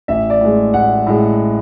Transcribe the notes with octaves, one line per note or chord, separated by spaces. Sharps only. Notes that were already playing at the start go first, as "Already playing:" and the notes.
A1 E5
D5
A2 G#3
A1 F#5
A2 G#3